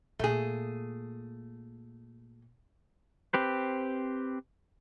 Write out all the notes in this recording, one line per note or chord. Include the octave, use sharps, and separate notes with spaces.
A#2 A3 G#4
C4 G4 B4 C5